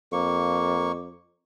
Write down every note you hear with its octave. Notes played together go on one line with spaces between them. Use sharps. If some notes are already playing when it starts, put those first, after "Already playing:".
F2 A#3 C#6